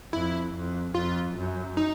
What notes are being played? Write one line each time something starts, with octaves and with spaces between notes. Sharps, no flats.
F2 E4
F2
F2 F4
F#2
D#4